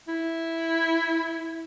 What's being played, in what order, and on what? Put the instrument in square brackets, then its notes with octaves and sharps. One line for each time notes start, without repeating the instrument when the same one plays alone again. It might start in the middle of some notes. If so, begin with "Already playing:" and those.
[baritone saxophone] E4